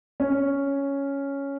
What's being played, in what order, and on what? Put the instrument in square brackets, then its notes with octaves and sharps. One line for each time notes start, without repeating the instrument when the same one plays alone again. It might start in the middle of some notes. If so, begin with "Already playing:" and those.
[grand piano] C#4